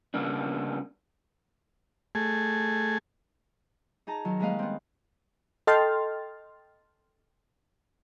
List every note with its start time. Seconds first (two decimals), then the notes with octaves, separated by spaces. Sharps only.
0.14 C#3 G3 A#3 B3 D4
2.15 A3 G#4
4.07 D#4 G#4 A5 A#5
4.25 D#3 F#3
4.39 G3 G#3 A#3 B4 D#5 F5
4.59 B3 C4
5.67 A4 D#5 G5 C6 F6 A6